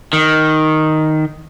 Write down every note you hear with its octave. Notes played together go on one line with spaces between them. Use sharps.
D#3